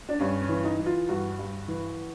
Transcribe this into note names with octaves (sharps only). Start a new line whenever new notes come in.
D4
G2 C#4
C#4
E3
D#4
E3
F4
G2 F#4
G2
E3